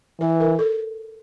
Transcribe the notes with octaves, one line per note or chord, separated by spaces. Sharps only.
E3 B4
A#4
A4